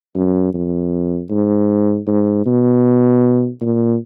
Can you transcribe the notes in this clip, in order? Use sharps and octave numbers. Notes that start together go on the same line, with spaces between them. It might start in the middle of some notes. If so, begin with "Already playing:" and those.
F#2
F2
G#2
G#2
B2
A#2